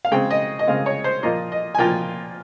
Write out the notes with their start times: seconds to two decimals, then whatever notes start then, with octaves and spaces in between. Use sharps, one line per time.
0.05 F5
0.12 C#3 G#3 C4 G5
0.30 D#5
0.59 D#5
0.67 C#3 G#3 C4 F5
0.86 C#5
1.04 C5
1.23 A#2 F3 A#3 F4 D#5
1.52 D#5
1.75 G#5
1.78 A#2 F3 A#3 F4 G5